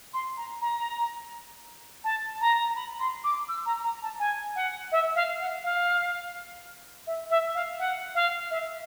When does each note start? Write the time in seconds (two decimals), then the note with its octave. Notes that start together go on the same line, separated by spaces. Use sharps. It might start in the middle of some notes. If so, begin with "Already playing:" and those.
0.13 C6
0.37 A#5
0.61 A#5
2.04 A5
2.41 A#5
2.69 A#5
2.76 B5
3.00 C6
3.24 D6
3.48 E6
3.66 A#5
3.83 A#5
4.02 A5
4.19 G#5
4.56 F#5
4.92 E5
5.15 F5
5.40 F#5
5.63 F5
7.07 E5
7.30 E5
7.55 F5
7.79 F#5
8.15 F5
8.50 E5